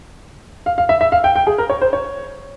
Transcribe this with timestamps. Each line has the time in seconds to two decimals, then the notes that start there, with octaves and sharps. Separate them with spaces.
0.66 F5
0.78 F5
0.89 E5
1.01 E5
1.12 F5
1.24 G5
1.36 G5
1.47 G#4
1.58 A#4
1.70 C#5
1.81 C5
1.93 C#5